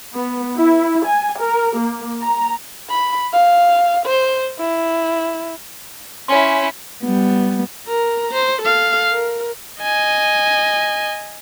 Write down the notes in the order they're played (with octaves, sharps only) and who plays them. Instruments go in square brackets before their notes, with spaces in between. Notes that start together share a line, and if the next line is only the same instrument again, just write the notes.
[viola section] B3
E4
G#5
A#4
A#3
A#5
[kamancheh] B5
F5
C5
E4
[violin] C#4 E4 [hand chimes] C#5 G#5 C6
[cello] G3 B3
[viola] A#4 A#5
C5
A4 F5
A#4
[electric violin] D#5 G#5